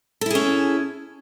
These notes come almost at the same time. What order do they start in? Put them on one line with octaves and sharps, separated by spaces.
A4 E4 G#4 C#4